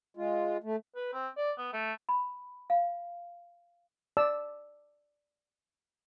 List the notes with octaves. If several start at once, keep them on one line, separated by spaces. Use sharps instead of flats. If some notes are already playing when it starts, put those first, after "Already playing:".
G#3 F4
A3
B4
C4
D5
B3
A3
B5
F5
D5 A5 E6